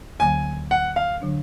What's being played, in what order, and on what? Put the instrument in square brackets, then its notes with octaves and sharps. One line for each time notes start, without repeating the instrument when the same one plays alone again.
[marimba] D2 D3 F#3 A#3 [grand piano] G#5
[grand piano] F#5
F5
[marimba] D3 F#3 D4